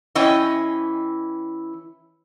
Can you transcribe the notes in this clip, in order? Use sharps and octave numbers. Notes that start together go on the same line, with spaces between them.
E3 C#4 E4 D#5 G5